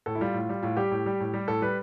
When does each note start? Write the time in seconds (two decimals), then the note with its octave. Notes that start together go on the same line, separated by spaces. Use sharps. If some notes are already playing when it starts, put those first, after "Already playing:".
0.06 A2 A4
0.15 E4
0.21 G3 F4
0.34 A2
0.49 G3
0.62 A2 F4
0.77 G3 G4
0.91 A2
1.06 G3
1.20 A2
1.34 G3
1.48 A2 A4
1.62 G3 B4